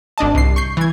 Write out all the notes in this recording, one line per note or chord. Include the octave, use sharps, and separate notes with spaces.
G#1 D4 D#5 A5
C2 C7
C#6 G6 C7
E3 G#6